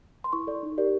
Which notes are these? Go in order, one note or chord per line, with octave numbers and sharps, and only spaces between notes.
C6
E4 C#6
A4 D5
D#4
G4 A#4 D5